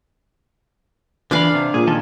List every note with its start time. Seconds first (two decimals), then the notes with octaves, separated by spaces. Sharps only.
1.31 D3 E3 D4 D5 F5 B5
1.55 C3
1.74 A#2 G#4
1.87 D#3 F3 A4